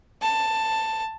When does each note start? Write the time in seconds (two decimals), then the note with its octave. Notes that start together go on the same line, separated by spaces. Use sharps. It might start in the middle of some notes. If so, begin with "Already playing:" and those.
0.22 A5